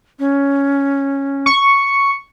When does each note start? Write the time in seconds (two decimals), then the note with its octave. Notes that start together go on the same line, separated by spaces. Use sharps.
0.19 C#4
1.46 C#6